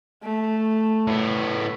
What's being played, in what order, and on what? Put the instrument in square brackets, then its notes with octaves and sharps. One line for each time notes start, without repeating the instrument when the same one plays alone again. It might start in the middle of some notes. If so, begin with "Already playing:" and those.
[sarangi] A3
[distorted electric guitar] A2 B3